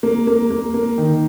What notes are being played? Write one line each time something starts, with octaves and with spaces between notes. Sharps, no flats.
A#3
A#3
A#3
A#3
D#3